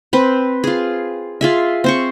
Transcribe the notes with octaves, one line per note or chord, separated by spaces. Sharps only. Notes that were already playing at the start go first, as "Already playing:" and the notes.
C4 B4
F4 G#4
F4 G#4 E5
C4 C5 C#6